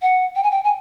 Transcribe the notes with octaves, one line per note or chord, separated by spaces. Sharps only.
F#5
G5
G#5
G5
G#5